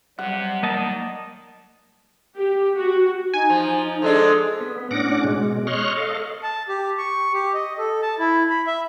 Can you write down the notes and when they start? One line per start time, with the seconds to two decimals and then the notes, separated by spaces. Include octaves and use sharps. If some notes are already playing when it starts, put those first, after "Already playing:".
0.19 C3 F#3 G3 F#5
0.63 D#3 A#3 D#5 A5
2.38 G4
2.78 F#4
3.34 D#4 G#5
3.50 F3
3.84 D#4
4.02 F3 G#3 D4 A4
4.61 B3
4.91 A2 C#4 D4 F#5 D6 A#6
5.24 B2 G#3
5.67 C#5 D#5 C6 C#6 F6 F#6
5.97 A4 D#5 F5
6.43 A5
6.69 G4
6.98 C#6
7.34 G4
7.54 D#5
7.78 A4
8.02 A5
8.19 E4
8.49 B5
8.67 E5